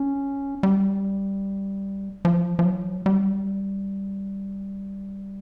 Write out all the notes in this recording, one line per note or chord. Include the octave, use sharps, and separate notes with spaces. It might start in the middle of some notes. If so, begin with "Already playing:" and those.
Already playing: C#4
G3
F3
F3
F#3
G3